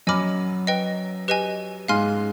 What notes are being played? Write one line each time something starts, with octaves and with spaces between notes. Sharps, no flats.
F#2 F#3 D#5 G#5 B5 D6 F6
B4 D#5 G5
G4 B4 D#5 G#5
G#2 G#3 F5 G#5 C6 F6